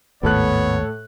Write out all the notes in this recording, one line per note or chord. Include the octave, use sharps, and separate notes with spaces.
G#1 D#2 A2 B3 A4 C#5 F#6